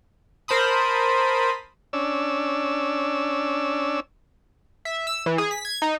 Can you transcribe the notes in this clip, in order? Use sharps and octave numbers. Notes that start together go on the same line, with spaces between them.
A#4 C5 A5 B5 D#6
C#4 D4 E6
E5
E6
E3
G#4
B6
G#6
D#4